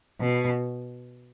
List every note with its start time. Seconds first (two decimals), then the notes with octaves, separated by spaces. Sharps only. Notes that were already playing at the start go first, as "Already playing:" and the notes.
0.20 B2